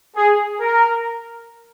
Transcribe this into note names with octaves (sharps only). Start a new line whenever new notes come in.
G#4
A#4